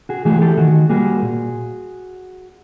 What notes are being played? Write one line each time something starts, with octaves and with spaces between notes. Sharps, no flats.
F#4 G#4
E3 A3 F#4 G#4
G4 A4
D#3 F#4 G#4
G3 A#3 F#4 G#4
A#2